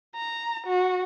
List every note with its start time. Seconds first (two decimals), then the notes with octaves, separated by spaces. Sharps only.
0.16 A#5
0.66 F#4